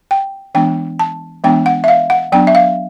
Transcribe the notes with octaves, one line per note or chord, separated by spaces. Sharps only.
G5
E3 G#3 B3 D4 G5
A5
E3 G#3 B3 D4 G5
F#5
E5
F5
F#5
F#3 B3 D4 G5
E5
F5